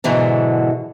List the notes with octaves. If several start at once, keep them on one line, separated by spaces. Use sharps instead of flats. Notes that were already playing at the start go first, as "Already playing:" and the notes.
G#2 B2 D3 E3 F#3 D4